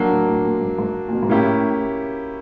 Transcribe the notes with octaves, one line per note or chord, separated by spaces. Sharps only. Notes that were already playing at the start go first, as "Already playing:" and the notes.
Already playing: F#3 A#3 D4
A2
A2
A#2
G#2
G#2
A#2
B2
G#2
A2 A#3 C#4 E4 G4